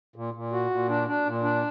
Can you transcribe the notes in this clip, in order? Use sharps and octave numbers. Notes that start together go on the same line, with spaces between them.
A#2
A#2
F#4
A#2
D4
D4
A#2
D4